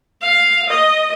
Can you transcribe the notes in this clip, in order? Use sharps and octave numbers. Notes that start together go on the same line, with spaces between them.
F5
D#5